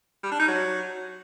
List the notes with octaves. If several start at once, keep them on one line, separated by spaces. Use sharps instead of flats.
G3
D4
D#4
F#3